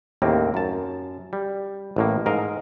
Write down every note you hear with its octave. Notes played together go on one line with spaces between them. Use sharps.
D#2 A2 C#3 A#3 C4
F#2 A5
G3
A1 A2 A#3
G#2 A#4 D#5 F5